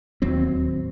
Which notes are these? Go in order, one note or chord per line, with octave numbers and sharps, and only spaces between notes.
D1 D#2 F#3 C4